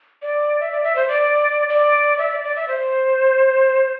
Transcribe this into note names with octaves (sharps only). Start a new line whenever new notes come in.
D5
E5
D5
E5
C5
D5
D5
E5
D5
D5
E5
C5